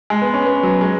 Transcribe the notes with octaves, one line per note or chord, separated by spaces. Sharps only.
G#3
B3
C#4
B3
F#3
G#3